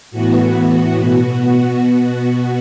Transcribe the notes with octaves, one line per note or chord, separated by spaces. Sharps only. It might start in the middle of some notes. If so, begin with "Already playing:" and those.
A2 E3 B3 F#4
B2 B3